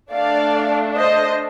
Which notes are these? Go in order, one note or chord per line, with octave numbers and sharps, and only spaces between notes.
A3 D4 A4 D5 F5
C5 D#5